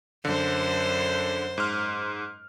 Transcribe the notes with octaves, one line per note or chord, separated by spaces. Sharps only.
F#2 D3 C5
G#2 C6 F6